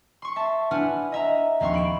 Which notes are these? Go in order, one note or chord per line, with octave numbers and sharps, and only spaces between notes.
C6 C#6
E5 A5
D4 E4 B4 F#5 G#5 F6
D#5 E5 A#5
A#1 D#2 C4 F5 C6 C#6
B5 D7 E7